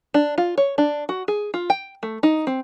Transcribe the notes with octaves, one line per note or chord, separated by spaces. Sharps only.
D4
F4
C#5
D4
F#4
G#4
F4
G5
A3
D#4
C4